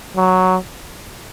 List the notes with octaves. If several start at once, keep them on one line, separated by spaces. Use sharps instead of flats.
F#3